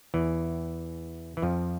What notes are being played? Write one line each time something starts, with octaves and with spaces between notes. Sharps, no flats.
E2 E3
E3
F2 F3